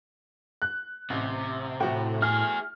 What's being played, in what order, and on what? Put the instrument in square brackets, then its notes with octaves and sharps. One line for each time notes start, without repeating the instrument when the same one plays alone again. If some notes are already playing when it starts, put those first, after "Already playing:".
[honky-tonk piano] F#6
[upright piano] A1 [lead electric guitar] C3
[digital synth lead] A2 [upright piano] A3 F#4 G5
[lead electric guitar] E4 G#4 [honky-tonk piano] F6